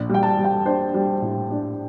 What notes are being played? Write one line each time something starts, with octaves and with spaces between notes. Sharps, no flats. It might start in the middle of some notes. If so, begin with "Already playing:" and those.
Already playing: A#1
G3 G5
A5
G3
G5
D4 C5
G3
A2
D4